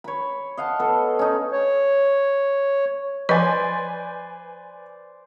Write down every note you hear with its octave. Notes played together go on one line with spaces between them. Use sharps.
C#5 B5
D#5 F5 F#5 A5
B3 A4
C#4 D#4
C#5
F3 B4 C5 D5 D#5 G#5